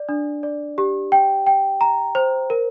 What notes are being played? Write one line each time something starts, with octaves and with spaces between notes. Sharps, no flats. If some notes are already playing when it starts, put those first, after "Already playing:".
Already playing: D5
D4
D5
G4
G5
G5
A#5
C5
A#4